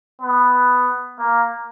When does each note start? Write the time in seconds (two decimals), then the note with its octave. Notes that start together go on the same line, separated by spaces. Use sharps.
0.22 B3
1.18 A#3